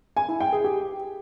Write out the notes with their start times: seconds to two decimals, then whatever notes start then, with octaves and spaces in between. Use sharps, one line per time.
0.17 G#5
0.28 E4
0.40 G5
0.52 G#4
0.64 G4